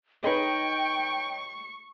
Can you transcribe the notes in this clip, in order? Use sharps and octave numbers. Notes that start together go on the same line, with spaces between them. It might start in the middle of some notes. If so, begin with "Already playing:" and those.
D#4 G#4 B4 C#5 D#5 G5 C#6